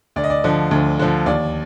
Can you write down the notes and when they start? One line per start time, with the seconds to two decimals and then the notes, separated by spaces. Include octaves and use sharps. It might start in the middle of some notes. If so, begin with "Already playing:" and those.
0.16 D2 D5
0.24 D#5
0.30 D5
0.44 D3 F3
0.71 D2
0.99 D3 F3
1.26 D#2 D5